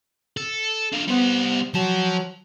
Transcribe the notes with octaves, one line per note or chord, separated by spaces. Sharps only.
A4
D4 F4
G3 B3 C5
F3 F#3 A5